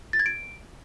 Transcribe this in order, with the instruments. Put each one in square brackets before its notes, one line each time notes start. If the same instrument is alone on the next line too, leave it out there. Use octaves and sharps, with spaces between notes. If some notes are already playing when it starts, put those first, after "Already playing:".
[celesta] A6
G#6
D7